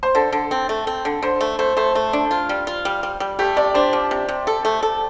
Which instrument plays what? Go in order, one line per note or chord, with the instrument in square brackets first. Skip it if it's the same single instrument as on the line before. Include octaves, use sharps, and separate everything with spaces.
[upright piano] C5
[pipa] D3 [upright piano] A4
[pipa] D3
C4
A3
C4
D3
[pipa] D3 [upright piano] C5
[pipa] A3
[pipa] A3 [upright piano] C5
[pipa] A3 [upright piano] C5
[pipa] A3
D4
F4
G3
F4
G3
G3
G3
[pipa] A3 [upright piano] G4
[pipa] C3 [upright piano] D5
[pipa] D4 [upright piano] C5
[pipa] F3
C3
C3
A4
A3
A4